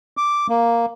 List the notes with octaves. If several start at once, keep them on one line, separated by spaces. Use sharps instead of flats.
D6
A#3